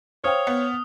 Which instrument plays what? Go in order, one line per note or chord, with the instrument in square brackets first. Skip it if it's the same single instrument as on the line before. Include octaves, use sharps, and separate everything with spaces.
[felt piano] C5 F5 G5 [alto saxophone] C#5 [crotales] D#6 F6
[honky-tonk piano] B3